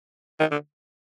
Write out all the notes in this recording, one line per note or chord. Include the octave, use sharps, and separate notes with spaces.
D#3
D3